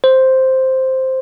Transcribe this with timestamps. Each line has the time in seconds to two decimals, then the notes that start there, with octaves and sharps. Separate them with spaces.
0.04 C5